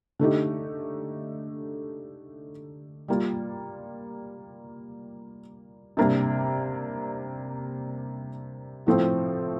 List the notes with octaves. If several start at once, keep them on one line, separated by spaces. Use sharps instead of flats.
D3 A3 D#4 G4
G3 A#3 F4
C3 G3 A#3 D4
A2 F3 A3 C4